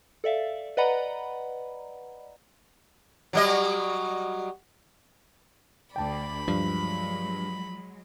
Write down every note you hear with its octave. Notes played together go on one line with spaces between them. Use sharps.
A4 D5 E5 F5
B4 D5 D#5 F#5 A#5 B5
F#3 G3 D#5
D2 D5 G5 A5 B5
G2 F3 F#3 G#3